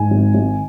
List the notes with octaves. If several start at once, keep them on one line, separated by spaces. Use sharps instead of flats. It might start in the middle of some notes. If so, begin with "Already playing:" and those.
Already playing: G#2 G#5
G#1
G#1